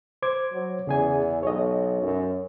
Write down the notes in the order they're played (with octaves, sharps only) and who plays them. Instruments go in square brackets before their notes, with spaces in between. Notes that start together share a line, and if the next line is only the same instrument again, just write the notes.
[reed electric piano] C5 D6 G#6
[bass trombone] F#3
[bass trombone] E2 [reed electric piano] C#3 G#4 G#5
[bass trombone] B1 [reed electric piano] C#5 D#5
[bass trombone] F#2